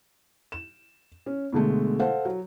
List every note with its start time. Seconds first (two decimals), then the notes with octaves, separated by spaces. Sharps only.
0.52 E7
1.26 C#4
1.53 B2 D3 G#3 A3
2.00 A4 C5 F5 F#5
2.25 F#3